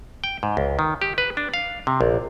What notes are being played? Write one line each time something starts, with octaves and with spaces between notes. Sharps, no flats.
G5
G#2
C#2
D#3
G4
B4
D4
F5
C3
A#1